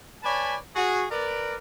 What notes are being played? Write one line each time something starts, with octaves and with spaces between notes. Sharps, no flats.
B4 C#5 D5 G#5 A5 B5
F#4 G#4
A#4 B4 D5